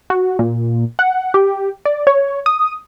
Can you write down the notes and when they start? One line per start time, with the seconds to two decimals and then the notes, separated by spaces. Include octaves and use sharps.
0.10 F#4
0.39 A#2
0.99 F#5
1.34 G4
1.85 D5
2.07 C#5
2.46 D#6